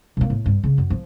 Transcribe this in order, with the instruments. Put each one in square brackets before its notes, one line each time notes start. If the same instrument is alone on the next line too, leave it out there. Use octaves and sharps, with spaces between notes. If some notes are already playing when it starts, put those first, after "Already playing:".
[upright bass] B2 A#3
A2
G2
C#3
F#2
F3